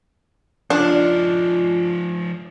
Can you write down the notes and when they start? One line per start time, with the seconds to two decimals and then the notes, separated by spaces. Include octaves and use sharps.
0.70 F3 D4 D#4 F4